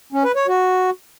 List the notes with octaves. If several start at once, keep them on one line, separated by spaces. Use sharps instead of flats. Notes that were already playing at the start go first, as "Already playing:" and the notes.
C#4
B4
C#5
F#4